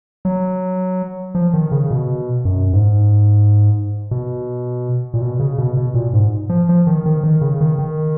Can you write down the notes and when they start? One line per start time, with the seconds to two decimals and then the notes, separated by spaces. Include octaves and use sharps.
0.25 F#3
1.35 F3
1.54 D#3
1.72 C#3
1.91 B2
2.45 F#2
2.73 G#2
4.11 B2
5.14 A#2
5.21 B2
5.39 C#3
5.58 B2
5.77 B2
5.94 A#2
6.13 G#2
6.49 F3
6.69 F3
6.87 D#3
7.06 D#3
7.24 D#3
7.41 C#3
7.61 D#3
7.79 D#3